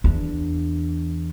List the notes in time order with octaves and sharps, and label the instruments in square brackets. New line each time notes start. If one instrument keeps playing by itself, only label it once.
[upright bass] E2 D4